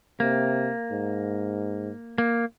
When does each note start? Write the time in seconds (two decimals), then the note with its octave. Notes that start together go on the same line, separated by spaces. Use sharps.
0.20 C3 A#3
0.92 G#2
2.18 A#3